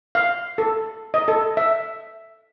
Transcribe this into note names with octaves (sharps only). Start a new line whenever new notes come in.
F5
A4
D#5
A4
E5